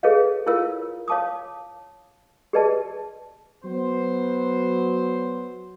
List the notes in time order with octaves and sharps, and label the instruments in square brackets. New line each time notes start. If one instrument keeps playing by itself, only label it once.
[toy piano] G#4 A4 B4 C#5 D#5 F5
E4 F4 A#4 C#5 F5 E6
C#5 F5 A5 D6 D#6
G4 G#4 B4 D5 D#5 A5
[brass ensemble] F#3 B3 C5